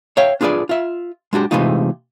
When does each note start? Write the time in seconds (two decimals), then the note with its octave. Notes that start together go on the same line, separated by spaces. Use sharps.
0.17 C#5 E5 F5 G5
0.41 D4 F4 G#4 B4 D5
0.69 F4 E5
1.33 G#3 D4 F#4 G4
1.51 C3 E3 G#3 A3 D#4 F4